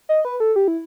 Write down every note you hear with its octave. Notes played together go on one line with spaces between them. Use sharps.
D#5
B4
A4
G4
E4